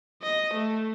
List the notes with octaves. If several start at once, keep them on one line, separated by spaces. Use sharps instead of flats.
D#5
A3